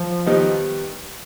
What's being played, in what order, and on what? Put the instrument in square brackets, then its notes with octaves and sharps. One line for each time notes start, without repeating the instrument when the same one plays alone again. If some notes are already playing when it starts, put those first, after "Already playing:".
Already playing: [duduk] F3
[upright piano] D#3 G3 B3 D#4 G4